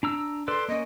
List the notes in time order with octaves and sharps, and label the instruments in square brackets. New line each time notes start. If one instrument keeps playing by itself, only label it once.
[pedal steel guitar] D4 A#5 E6
[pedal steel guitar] A4 B4 D5 [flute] C6
[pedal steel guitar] A#3 C#4 [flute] D#5